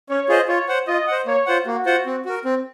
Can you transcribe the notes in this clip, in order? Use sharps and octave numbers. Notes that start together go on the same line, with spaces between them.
C#4 C#5
F4 G#4 C5 D#5
F4 C#5
C5 F#5
F4 D#5
C5 F#5
A#3 C#5
F4 C5 F#5
A#3 F#4
F4 C5 F#5
C4
F#4 A#4
C4